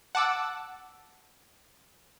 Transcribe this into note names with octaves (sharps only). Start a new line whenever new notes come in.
F#5 A5 D6 E6